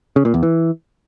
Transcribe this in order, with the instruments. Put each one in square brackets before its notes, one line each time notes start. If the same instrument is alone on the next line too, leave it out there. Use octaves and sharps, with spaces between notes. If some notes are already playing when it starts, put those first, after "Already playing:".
[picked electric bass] C#3
A#2
E2
E3